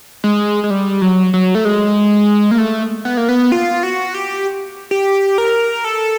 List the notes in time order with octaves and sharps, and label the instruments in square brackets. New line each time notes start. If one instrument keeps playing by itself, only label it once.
[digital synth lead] G#3
G#3
G3
F#3
F#3
A3
G#3
A#3
A3
B3
A#3
B3
F4
F#4
G4
G4
A#4
A4